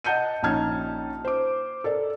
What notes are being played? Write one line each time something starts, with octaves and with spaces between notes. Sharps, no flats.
D#5 F#5 A5 G6 C#7 D#7
A#1 C#4 D#4 A5 F6 G#6
C5 D6
A4 A#4 D5